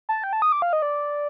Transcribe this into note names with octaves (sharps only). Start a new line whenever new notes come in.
A5
G5
A5
D#6
D6
F5
D#5
D5